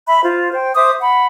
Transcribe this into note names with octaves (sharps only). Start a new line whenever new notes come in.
E5 B5
F4 C5
C5 G5
C5 E5 D6 D#6
F#5 B5